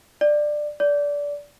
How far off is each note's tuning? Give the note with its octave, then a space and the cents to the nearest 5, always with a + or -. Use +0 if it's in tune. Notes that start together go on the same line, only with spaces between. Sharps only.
D5 +15
D5 -20